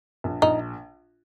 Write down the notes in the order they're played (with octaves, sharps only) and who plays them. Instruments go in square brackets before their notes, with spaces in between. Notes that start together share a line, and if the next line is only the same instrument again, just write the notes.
[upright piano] A#1
[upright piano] A#1 [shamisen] D#4